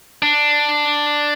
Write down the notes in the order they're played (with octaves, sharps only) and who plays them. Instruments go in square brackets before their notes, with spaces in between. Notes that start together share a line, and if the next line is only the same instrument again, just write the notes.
[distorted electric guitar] D4